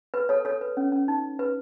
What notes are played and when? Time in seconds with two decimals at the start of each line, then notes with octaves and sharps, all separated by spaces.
0.14 B4
0.29 A4 C#5
0.45 A4 C#5
0.61 B4
0.77 C#4
0.92 C#4
1.08 D#4
1.39 B4